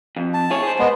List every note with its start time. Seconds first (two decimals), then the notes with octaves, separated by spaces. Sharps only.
0.17 F2
0.34 A5
0.50 E4 G#4 C#5
0.63 G#4 C5
0.79 G#3 B3